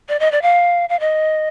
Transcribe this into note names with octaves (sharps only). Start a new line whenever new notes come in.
D5
D#5
D5
F5
F5
D#5